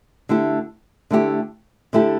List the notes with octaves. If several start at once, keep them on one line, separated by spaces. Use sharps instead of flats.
D3 A3 E4 G4
D3 A3 E4 G4
D3 A3 E4 G4